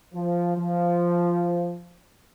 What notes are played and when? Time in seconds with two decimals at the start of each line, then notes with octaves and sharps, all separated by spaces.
0.14 F3
0.57 F3